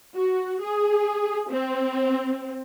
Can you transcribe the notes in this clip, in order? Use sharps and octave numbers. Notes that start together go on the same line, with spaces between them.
F#4
G#4
C4